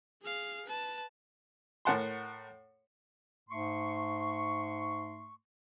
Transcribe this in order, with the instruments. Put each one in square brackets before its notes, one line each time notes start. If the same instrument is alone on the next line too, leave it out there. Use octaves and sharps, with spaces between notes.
[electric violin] G#4 F5
B4 A5
[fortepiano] A2 A#4 F#5 A5 C6
[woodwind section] G#2 A3 C6 C#6